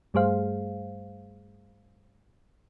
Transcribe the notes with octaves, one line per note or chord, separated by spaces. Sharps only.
G2 G3 A3 G#4 C5 F5